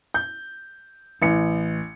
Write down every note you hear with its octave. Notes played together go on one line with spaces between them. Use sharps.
G6
A1 C#7